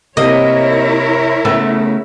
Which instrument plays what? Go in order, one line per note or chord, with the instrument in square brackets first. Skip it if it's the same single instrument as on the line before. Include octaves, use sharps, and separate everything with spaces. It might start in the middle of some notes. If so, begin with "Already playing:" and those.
[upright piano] C3 [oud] A#3 [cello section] E4 A#4 C#5 [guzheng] D#5
[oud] C#3 A3 B3 [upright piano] E6